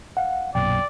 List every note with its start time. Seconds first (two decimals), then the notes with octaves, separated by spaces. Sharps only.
0.17 F5 F#5
0.55 B1 F#2 A#2 D5 G5